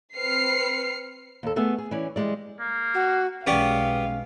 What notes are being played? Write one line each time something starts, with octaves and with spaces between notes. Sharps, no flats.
C4 B4 F6 C7 C#7
D#2 A4
A3 B3 G#4 E5
G#4
E3 C#4 D5
E3 G3 G#3 D5
A#3
F#4
B1 G#3 B3 C#4 G4 D5 F5